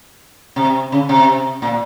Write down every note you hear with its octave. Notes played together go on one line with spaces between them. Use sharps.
C3
C#3
C3
A#2